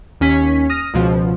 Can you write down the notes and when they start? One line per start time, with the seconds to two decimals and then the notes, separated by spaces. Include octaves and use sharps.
0.21 D#2 C#4 B6
0.70 D#6 F6 A#6
0.94 C#2 B2 F3